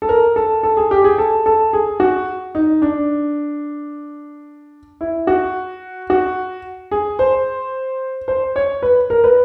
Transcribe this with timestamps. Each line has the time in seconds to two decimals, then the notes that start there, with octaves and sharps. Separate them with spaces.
0.02 A4
0.09 A#4
0.36 A4
0.63 A4
0.77 G#4
0.91 G4
1.04 G#4
1.18 A4
1.46 A4
1.73 G#4
2.00 F#4
2.55 D#4
2.82 D4
5.01 E4
5.27 F#4
6.10 F#4
6.91 G#4
7.19 C5
8.28 C5
8.56 C#5
8.82 B4
9.10 A#4
9.24 B4